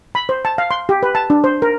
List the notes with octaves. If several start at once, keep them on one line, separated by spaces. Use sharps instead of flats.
B5
C5
A5
F5
C6
G4
B4
A5
D4
C5
A#4